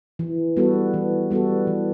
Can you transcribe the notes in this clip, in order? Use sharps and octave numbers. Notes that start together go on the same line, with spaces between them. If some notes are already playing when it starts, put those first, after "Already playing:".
E3
G3 B3 F#4 A4
E3
G3 B3 F#4 A4
E3